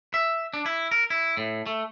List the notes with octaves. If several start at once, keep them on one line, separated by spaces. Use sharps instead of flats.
E5
D4
E4
A#4
E4
A2
A3